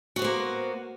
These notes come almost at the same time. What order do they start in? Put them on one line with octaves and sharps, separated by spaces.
F#4 B3 C5 A#3